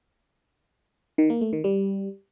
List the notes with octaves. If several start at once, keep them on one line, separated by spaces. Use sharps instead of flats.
D#3
A#3
A3
D#3
G3